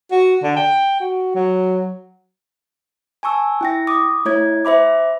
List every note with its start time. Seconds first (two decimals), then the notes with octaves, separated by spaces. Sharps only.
0.11 F#4
0.43 D3
0.56 G5
1.00 F#4
1.35 F#3
3.23 G#5 A5 C#6 E6
3.61 E4 G5 A#6
3.87 D6 D#6
4.25 A3 E4 C#5 G#6
4.65 C5 E5 B5 D6